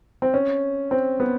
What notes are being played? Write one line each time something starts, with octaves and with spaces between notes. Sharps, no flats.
C4
C#4
C4
B3